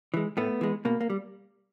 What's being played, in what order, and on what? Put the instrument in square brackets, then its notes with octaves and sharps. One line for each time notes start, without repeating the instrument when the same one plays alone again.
[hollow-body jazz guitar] E3 G#3
A2 A3 B3
E3 G#3
B2 A#3
A#3
G3